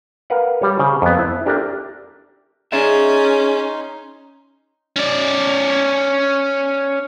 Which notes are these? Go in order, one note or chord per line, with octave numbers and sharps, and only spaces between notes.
A#4 B4 F5 F#5
G3 C#5
C#3 C5
F2 B3
E4 C5
D4 G4 A4 A#4 E5
C#4 D#4 G#4 D5 E5 C6
C#4 D5